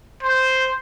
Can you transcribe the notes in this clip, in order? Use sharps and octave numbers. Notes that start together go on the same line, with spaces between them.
C5